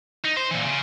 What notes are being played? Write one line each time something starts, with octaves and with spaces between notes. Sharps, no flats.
D#4
C5
A#2 E3
C#3